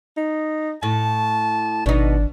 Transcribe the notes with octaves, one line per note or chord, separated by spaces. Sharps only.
D#4
A2 A5
G#1 B2 D4 D#4